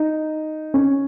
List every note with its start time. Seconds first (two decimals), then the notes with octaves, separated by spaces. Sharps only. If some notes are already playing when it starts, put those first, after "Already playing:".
Already playing: D#4
0.74 C#4